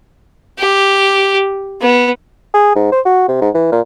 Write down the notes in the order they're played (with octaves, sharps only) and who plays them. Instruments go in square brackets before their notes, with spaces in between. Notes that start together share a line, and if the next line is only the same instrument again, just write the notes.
[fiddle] G4
B3
[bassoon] G#4
G#2
C5
F#4
C3
G#2
E3
A#2